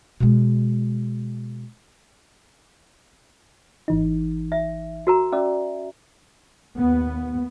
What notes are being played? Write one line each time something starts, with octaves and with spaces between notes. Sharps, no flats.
B2 G#3
G#1 E3 D#4
E5
F#4 A#4 A#5
C#4 D5 E5
D#2 B3